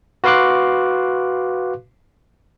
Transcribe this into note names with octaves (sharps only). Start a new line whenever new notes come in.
F#4 B4 F5 C6 D6 F#6